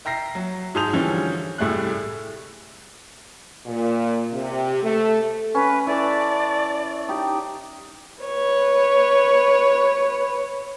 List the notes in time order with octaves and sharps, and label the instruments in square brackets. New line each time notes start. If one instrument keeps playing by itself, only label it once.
[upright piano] E5 G5 A#5 A#6 C7
F#3
G#2 G#4 A5 D#6 G6 F7
D3 E3 F3 G3 C#4
C2 A2 G3 A3 G#4 F#6
[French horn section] A#2
C3
A3
[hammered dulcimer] C#4 [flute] B4
[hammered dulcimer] E3 A4 [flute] D5
[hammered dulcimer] D#4 G4
[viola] B4 C#5